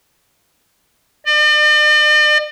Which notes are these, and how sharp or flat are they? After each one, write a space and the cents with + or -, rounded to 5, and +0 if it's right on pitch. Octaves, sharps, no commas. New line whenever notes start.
D5 +45